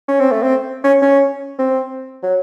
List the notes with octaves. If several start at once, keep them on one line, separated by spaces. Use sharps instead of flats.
C#4
C4
A3
C4
C#4
C#4
C4
F#3